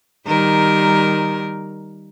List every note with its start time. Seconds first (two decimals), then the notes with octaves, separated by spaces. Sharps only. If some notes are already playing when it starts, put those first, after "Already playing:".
0.26 D#3 G3 A#4